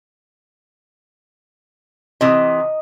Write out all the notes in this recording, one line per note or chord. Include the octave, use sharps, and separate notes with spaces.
C3 E3 D#5